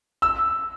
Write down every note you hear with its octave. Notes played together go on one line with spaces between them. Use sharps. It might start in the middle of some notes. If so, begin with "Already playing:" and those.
E6